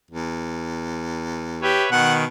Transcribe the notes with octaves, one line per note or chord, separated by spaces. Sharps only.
E2
G4 B4 C#5 E5
B2 D#3 F#5